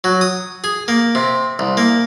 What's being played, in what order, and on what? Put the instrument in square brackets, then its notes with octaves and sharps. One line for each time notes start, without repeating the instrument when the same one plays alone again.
[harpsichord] F#3
D#6
G#4
A#3
C3
C2
A#3